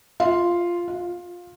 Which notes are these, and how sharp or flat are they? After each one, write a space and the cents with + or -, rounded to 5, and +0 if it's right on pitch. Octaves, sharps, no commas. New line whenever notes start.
F4 -5
F4 +15